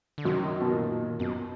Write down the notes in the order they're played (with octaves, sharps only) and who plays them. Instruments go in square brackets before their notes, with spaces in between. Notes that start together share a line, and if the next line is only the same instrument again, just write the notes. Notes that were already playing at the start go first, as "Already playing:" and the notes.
[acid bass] D3
[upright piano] F#2 F#3 [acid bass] D#3
[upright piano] B2
A#2
[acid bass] F#2 [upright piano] B2